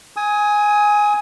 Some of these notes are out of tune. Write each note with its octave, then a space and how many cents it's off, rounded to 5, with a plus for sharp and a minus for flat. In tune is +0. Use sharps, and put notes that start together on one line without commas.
G#5 +0 D#6 +30